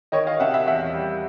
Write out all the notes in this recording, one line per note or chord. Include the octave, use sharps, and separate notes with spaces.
D#3 C#5 D#5
D#5 F5
C3 E5 F#5
E5 F#5
E2 E5 F#5
G3